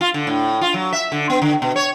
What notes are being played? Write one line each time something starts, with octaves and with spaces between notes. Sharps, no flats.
F4
D3
A2
F4
F#3
E5
D3
B3
D3
B2
C#5